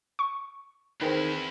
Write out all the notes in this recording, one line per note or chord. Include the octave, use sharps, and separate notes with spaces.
C#6
E2 D#3 C4 E4 G#4 B4